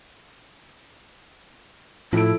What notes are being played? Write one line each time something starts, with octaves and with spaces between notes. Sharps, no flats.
A2 F3 E4 A4 D7